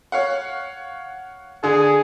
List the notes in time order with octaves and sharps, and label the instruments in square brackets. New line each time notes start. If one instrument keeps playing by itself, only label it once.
[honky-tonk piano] C#5 F5 F#5
[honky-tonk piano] D3 [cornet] G#4